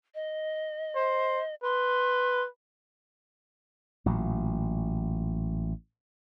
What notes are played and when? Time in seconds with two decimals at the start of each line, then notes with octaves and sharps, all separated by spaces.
0.15 D#5
0.96 C5
1.63 B4 C6
4.06 A1 A#2 F#3